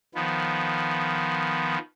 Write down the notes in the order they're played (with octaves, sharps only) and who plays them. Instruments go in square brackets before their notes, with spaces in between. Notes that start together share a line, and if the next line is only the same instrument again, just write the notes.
[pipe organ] D#3 F3 B3